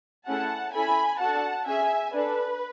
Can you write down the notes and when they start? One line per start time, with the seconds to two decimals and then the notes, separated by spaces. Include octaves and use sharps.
0.27 A3 C#4 E4 G#4 F#5 A5
0.74 C#4 E4 A4 G#5 B5
1.20 D4 F#4 A4 F#5 A5
1.67 C#4 G#4 E5 G#5
2.14 D4 A4 B4